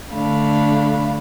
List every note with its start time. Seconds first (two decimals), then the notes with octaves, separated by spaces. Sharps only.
0.13 D3 A3 D4 F5 B5